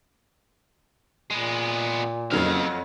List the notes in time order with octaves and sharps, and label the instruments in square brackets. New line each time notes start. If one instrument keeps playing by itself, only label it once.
[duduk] A#2 [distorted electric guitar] G#3 B3
[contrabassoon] F#1 [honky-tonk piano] F2 F#3 F6 [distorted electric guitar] D#4 F5